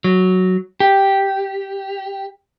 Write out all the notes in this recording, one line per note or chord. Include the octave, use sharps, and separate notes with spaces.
F#3
G4